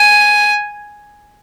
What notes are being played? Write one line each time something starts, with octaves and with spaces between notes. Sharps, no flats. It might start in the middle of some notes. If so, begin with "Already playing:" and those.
Already playing: G#5